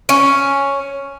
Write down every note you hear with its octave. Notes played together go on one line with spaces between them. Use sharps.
C#4